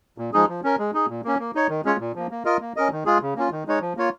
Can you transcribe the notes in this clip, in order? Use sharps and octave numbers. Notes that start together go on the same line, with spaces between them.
A#2
F3 G#3 D#4 G#4
F3
C#4 A#4
G#3
D#4 G#4
A#2
A#3 C#4
A#3
D#4 C#5
D#3
G#3 C#4 F4 C#5
A#2
F3 A#3
A#3
F4 A#4 D#5
A#3
C#4 A#4 D#5
D#3
G#3 F4 G#4
C#3
A#3 C#4 F4
D#3
G#3 D#4 C#5
F3
A#3 F4 C#5